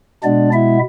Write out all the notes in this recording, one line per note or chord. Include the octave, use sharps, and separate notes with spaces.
B2 G#3 B3 D4 D5
E4 E5